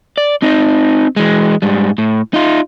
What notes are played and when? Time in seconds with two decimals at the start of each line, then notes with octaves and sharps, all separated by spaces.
0.18 D5
0.42 C4 D#4
1.16 E3 G#3
1.62 G#2 G3
1.98 A2
2.34 D#4 F4